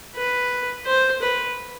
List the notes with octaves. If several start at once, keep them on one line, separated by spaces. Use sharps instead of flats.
B4
C5
B4